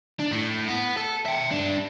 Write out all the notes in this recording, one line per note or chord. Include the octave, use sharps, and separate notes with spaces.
D4
A2
B3
A4
E5 G5
G3 D4